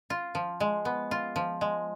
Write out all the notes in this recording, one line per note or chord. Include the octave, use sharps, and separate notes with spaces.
F4
F3
G#3
B3
F4
F3
G#3